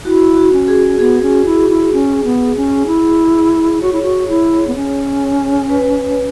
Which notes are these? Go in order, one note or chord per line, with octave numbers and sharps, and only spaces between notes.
E4 F#4
F#4
C#4
G#4
B3 G#4
C#4
E4
E4
C#4
B3
C#4
E4
F#4 C#5
E4
F#4
E4
B3
C#4
B4